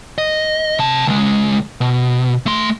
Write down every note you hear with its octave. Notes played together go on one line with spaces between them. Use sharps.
D#5
C3 A5
C#2 G#3
B2
A3 C6